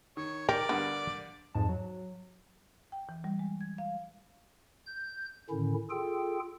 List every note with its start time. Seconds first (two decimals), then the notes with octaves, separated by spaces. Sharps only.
0.17 D#3 C#5
0.49 G4 A#4 D5
0.69 G2 D3 B3
1.55 F2 G#2 A5
1.69 F#3
2.92 G5
3.09 E3
3.24 G3
3.39 G#3
3.61 G#6
3.78 F5
4.86 G6
5.50 A2 D3 D#3 C#4 E4
5.90 F4 G#4 A4 G5